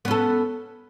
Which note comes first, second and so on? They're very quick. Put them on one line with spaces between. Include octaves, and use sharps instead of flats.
B3 C#4 A4